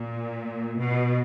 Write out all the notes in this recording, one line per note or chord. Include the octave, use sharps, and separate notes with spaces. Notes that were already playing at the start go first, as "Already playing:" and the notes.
Already playing: A#2
B2